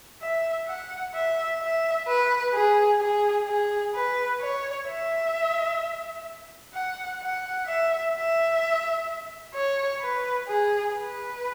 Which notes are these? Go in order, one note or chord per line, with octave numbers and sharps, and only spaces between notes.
E5
F#5
E5
E5
B4
G#4
G#4
G#4
B4
C#5
E5
F#5
F#5
E5
E5
C#5
B4
G#4
B4